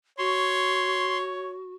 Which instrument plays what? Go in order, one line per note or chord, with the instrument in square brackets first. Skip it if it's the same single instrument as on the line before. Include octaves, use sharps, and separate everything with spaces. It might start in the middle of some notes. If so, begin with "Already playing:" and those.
[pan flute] F#4 [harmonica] C#5 [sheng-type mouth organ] C6